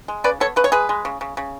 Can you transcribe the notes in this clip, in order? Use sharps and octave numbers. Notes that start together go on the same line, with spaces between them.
G#3
C#3 B4 D5
B3 A4 C#5
C#3 B4
C#5
G#3 G#4 B4
G#3
C#3
C#3
C#3